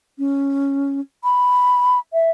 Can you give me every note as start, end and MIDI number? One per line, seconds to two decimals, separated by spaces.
0.18 1.00 61
1.24 1.99 83
2.13 2.31 76